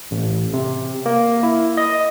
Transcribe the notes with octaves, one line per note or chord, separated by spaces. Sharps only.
A1
C3
A#3
E4
D#5